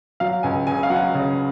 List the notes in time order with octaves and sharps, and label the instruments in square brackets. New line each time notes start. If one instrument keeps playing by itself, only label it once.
[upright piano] F#3 F5
C#2 G#5
C#3 G#5
F5
F#3 F#5
C#3